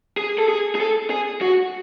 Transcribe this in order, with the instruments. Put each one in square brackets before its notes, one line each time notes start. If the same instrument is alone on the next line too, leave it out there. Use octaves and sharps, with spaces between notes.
[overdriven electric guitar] G#4
A4
G#4
G#4
A4
G#4
F#4